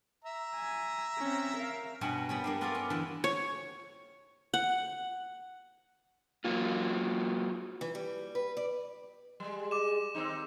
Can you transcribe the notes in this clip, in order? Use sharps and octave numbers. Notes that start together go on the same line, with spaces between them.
E5 A#5
G#5
C4 C#4
A#4 F5
G2 B2 C#4 F#4 F#5 G5
G3 B3 C#4
G3 A#3 D4
B3 F4 A4 A#4 D5 F5
C#4
D3 E3 A4
C#5
F#5
F#3 A#3 F4
E3
G3
B4
D5
G3 G#3
D6 E7
D#2 C4 D#4